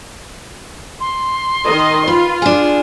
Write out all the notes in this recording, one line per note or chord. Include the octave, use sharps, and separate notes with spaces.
C6
D#3 D#5
F4 B4
D4 G#4